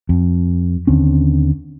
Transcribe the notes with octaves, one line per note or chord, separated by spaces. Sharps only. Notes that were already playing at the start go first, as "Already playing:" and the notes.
F2
D#2 D3 C4 C#4